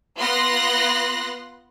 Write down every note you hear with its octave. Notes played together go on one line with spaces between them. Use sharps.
B3 F4 C6 F#6 A#6